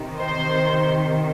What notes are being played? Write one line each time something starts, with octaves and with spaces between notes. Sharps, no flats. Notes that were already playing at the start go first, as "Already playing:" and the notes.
Already playing: C3 D#3
C5